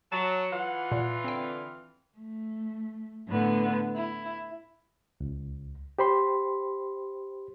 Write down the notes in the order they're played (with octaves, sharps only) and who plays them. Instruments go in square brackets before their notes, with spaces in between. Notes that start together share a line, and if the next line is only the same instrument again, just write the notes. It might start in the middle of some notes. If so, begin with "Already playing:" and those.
[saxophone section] F#3 [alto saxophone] A5
[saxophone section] E3 F4 [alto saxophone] F#5
[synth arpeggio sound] A#2
[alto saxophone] D3 [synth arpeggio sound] C4 G5
[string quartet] A3
A2 D3 B3
E4
[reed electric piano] C#2
G4 C5 B5 C6